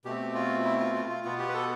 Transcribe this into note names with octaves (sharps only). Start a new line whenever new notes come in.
B2 A3 C4 G4
F4
E4
F4
F4
F4
B2 B3 F4
G4
B4
A4